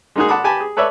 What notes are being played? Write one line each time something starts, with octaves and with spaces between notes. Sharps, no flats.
G#3 A#3 D#4 F#4 G#4
F#5 A5 B5 D6 D#6
G4 G#5 A5 B5
G#4
A4 B4 C#5 D5 E5